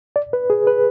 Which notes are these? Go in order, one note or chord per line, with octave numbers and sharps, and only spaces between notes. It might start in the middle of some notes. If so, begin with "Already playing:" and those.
D5
B4
G#4
B4